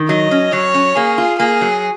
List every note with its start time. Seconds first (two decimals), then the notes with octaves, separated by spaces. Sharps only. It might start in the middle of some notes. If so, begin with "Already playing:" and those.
Already playing: D#3
0.09 F#3 D#5
0.31 C#4
0.52 F#3 C#5
0.74 C#4
0.96 A#3 G#4
1.18 F4
1.39 A#3 G#4
1.61 F#3